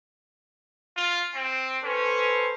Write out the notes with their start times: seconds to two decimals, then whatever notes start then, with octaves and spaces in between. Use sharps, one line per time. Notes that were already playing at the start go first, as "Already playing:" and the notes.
0.97 F4
1.34 C4
1.84 C#4 A4 B4 C5